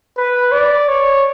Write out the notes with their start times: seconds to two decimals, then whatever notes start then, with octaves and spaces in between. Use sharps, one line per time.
0.17 B4
0.52 D5
0.88 C#5